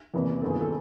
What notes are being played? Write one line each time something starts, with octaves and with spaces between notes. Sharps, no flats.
F#1 E2 C3 E3
G1 F#2 D#3 A4
G#4
A4